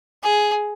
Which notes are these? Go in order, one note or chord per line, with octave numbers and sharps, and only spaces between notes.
G#4